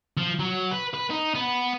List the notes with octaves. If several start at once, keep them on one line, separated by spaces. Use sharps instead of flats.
F3
F#3
B4
B4
D#4
B3